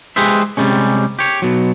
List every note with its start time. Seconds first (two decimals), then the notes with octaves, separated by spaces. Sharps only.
0.16 G#3 G4 G#4 B4 C5 E5
0.57 C3 G3 G#3 C#4
1.19 G4 C#5
1.42 B2 F#3